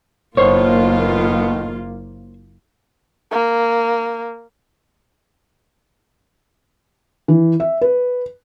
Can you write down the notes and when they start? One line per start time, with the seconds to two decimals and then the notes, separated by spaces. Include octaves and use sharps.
0.37 F#1 A2 D#3 A#3 B3 F4 C5 C#5
3.32 A#3
7.28 E3
7.60 E5
7.82 B4